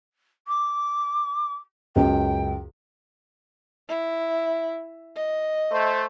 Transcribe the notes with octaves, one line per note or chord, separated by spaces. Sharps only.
D6
C#2 F#2 G5
E4
D#5
A3 C5